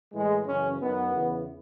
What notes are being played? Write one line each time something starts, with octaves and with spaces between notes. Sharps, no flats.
A2 E3 G#3
F#2 C#3 E3 C#4
F#2 D#3 B3
E2 C#3 E3